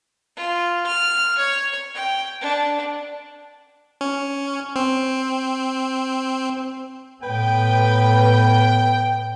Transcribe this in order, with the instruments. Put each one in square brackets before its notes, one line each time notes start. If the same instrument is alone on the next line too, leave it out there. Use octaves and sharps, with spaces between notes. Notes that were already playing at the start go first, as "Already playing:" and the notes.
[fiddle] F4
F6
C#5
G5
D4
[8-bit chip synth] C#4
C4
[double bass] A2 B3 [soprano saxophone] B4 [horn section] G5